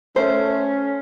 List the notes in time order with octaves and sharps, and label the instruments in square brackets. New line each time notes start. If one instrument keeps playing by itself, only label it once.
[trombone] A3 [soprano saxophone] C#4 [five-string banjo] C5